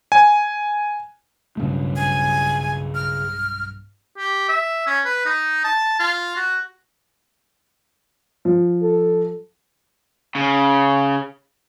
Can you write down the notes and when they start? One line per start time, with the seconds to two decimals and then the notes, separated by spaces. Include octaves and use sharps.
0.12 G#5
1.57 B1 G2 C#3 A3
1.96 G#5
2.95 F6
4.17 G4
4.49 E5
4.87 C#4
5.05 B4
5.26 D#4
5.64 A5
5.99 F4
6.36 F#4
8.45 F3
8.83 A4
10.35 C#3